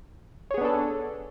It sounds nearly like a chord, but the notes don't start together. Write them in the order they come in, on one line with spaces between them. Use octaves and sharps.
C#5 G#4 B3 D4 A4